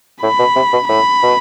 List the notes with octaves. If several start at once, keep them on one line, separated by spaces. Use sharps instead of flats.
A2 B5
B2
C3
B2
A2 B5
B2